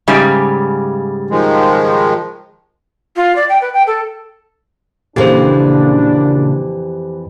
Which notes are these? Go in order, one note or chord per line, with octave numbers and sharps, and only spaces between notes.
G#2 C#3 G3
D#3 F3 G#3
F4
D5
G5
B4
G5
A4
F2 A#2 C#3 E3 A#3 D4 G4 C5